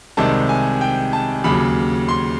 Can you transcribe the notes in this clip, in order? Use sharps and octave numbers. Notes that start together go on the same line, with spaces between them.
C2 C3 D#3 G#3 A5
G#5
G5
A5
D#2 C#3 F#3 B5
C6